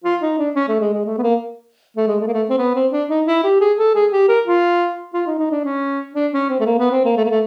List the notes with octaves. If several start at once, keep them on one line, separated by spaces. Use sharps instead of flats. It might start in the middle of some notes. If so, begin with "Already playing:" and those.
F4
D#4
D4
C#4
A3
G#3
G#3
A3
B3
A#3
A3
G#3
A3
A#3
A3
C4
B3
C4
D4
D#4
E4
G4
G#4
A4
G#4
G4
A#4
F4
F4
D#4
D#4
D4
C#4
D4
C#4
C4
A3
A#3
B3
C4
A#3
A3
A#3
A3